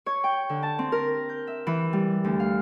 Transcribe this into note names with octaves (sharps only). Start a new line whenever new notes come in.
C#5
G5
D3
A5
C4
A#4
G6
E5
E3
G3
D2
F5